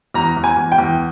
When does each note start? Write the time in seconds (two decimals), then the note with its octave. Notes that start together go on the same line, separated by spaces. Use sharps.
0.14 E2 A#5
0.37 E2
0.44 G#5
0.57 E2
0.72 G5
0.78 E2